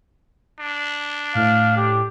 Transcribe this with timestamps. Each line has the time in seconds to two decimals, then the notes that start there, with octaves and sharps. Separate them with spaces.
0.59 D4
1.35 A2 F5
1.77 G4